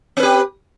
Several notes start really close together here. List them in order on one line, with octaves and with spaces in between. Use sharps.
C4 B4 G4